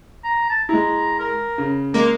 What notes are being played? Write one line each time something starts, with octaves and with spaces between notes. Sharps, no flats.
A#5
A5
G#3 E4 A#5
A#4
C#3
G#3 A#3 A#5